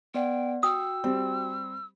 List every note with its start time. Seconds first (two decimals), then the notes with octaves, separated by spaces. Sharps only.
0.14 B3 D5 F#5 G5
0.63 F#4 G5 D#6 E6
1.04 G3 C4